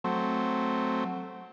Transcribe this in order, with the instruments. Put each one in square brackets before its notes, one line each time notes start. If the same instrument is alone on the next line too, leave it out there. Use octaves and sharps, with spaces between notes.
[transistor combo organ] F#3 A3 C4